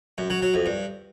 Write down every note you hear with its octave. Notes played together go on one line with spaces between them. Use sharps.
F#2
F#3
F#3
F2
G2